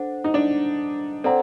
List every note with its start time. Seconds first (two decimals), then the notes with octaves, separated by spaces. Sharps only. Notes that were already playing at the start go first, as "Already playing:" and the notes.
Already playing: D4 A4 C5 F#5
0.24 D#4
0.34 D4
1.24 C4 A4 D5 F#5 A#5